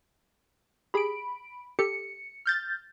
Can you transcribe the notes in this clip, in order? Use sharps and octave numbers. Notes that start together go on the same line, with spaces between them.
G4 G#4 B5 D7
G4 A4 C#7
F6 G6 A6